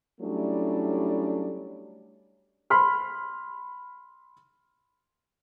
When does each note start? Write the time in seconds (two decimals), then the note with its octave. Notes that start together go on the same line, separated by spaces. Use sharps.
0.21 F#3 G3 A3 C#4 D4 E4
2.70 B5 C6 F6